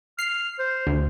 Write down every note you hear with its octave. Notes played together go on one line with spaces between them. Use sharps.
F6 C7
C5
D2